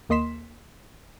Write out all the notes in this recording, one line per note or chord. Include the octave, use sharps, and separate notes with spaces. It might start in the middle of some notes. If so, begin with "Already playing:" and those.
D#2 A#3 D#5 C6 B6 E7